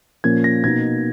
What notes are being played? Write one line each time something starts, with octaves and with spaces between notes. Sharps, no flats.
A#2 F3 A#3 C#4 G#6
A#6
B2 A#3 D#4 G#6